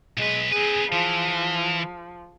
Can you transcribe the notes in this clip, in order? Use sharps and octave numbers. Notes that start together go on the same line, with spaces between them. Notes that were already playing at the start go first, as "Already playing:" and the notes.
B1 G#3 B4
C4 G#4 B4
E3 F3